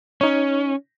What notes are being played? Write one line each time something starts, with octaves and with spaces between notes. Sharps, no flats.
C#4 D#4 C#5